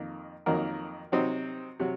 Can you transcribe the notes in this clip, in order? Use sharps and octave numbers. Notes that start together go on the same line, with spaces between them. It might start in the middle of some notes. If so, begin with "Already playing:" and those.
Already playing: F2 D#3 A#3
F2 D#3 F#3 A#3 A#4
C3 F#3 C4 D#4
C3 F#3